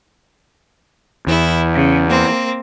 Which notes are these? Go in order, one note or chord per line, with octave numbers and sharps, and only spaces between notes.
E2 E4
C#3
A#3 C4